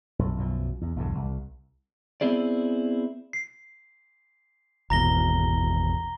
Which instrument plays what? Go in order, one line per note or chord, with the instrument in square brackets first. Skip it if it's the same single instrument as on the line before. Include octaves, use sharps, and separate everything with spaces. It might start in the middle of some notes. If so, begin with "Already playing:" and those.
[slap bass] B1 F#2
B1 F#2 B2 F3
E2
B1 E2 G2 D3
C2
[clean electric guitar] B3 C4 E4 G#4 D5
[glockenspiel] C7
[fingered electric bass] G#1 E2 B2 [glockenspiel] A#5 A#6 G7